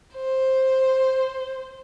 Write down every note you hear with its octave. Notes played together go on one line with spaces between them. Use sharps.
C5